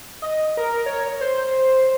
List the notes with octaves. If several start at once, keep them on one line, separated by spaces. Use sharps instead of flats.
D#5
A#4
C#5
C5